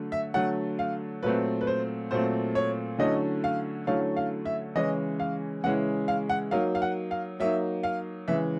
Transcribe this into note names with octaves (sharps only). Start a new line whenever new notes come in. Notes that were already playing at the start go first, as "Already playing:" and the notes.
Already playing: D3 F#3 A3
E5
D3 F#3 A3 F#5
F5
A#2 F#3 A3 C4 B4
B4
C5
A#2 F#3 A3 C4 C5
C#5
D3 F#3 A3 C#4 E4 D#5
F5
D3 F#3 A3 C#4 E4 F5
F5
E5
C#3 E3 G#3 C#4 E4 D#5
F5
C#3 E3 G#3 C#4 E4 F#5
F5
F#5
F#3 A#3 D#4 F5
F5
F#5
F5
F#3 A#3 D#4 E5
F5
C#3 E3 G#3 E5